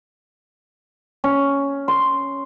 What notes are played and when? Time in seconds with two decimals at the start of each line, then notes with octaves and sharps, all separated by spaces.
1.24 C#4
1.88 C6